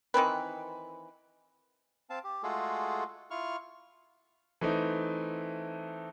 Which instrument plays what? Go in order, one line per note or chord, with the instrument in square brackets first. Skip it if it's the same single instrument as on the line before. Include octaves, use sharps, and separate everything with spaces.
[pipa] D#3 E3 C4 B4
[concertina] C4 F5 A5
G4
G#3 A3 F4 F#4 G#4 A4
E4 F4 C#6 F6
[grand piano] E3 A3 C4 D#4